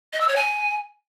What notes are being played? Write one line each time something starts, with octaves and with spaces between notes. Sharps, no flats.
D#5
E6
C#5
G#5